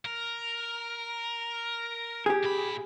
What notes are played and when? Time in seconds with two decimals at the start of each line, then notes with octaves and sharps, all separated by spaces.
0.05 A#4
2.26 G4 G#4
2.43 A#2 B5